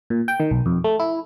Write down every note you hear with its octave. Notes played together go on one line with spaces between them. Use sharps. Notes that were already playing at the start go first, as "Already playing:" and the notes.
A#2
G5
D#3
B1
F2
A3
E4